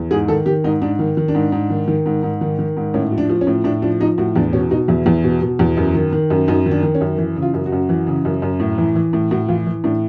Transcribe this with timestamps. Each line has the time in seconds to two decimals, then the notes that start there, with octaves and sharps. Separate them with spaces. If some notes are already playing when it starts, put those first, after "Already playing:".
Already playing: E2
0.11 G#2 G#4
0.28 D#3 A4
0.46 D#3 G4
0.64 G#2 D#4
0.82 G#2 D4
0.99 D#3
1.17 D#3
1.28 D4
1.35 G#2
1.52 G#2
1.70 D#3
1.88 D#3
2.06 G#2
2.23 G#2
2.41 D#3
2.59 D#3
2.77 G#2
2.94 A2 C#4
3.12 F3
3.18 D4
3.29 F3
3.41 C#4
3.47 A2
3.64 A2 D4
3.82 F3 D4
4.00 F3 D#4
4.18 A2 F#4
4.35 E2 D4
4.53 B2 C#4
4.71 B2 D#4
4.88 E2 E4
5.06 E2
5.24 B2
5.42 B2
5.59 E2
5.77 F#2
5.95 D#3
6.13 D#3
6.30 F#2
6.48 F#2 D#4
6.66 D#3
6.71 D4
6.83 D#3
6.95 C#4
7.01 F#2
7.18 E3
7.36 C#3
7.42 F4
7.54 F#2
7.66 F#4
7.72 F#2
7.89 E3
8.07 C#3
8.25 F#2
8.42 F#2
8.60 A2
8.78 E3
8.95 E3
9.13 A2
9.31 A2 F#4
9.48 E3 F4
9.66 E3
9.84 A2 D4